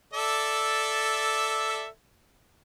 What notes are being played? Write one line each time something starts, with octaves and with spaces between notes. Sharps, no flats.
A4 D5 E5